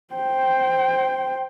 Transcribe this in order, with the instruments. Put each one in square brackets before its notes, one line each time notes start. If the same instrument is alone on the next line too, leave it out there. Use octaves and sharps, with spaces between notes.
[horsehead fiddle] C5 G5